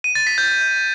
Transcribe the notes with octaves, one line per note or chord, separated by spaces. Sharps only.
D#7
A6
B6
G6